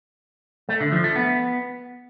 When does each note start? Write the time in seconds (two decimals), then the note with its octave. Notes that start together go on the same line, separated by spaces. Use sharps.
0.69 A3
0.80 D3
0.92 F3
1.04 A3
1.16 B3